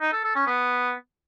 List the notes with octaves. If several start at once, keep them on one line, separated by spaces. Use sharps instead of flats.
D#4
A4
A4
C#4
B3